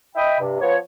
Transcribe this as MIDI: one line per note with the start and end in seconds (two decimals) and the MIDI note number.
0.16 0.38 75
0.16 0.38 76
0.16 0.38 79
0.16 0.38 83
0.40 0.60 43
0.40 0.60 48
0.61 0.76 53
0.61 0.76 59
0.61 0.76 73